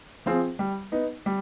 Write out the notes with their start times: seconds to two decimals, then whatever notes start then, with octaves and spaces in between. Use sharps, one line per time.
0.26 F3 C4 F4 G#4
0.59 G3
0.92 B3 D#4
1.26 G3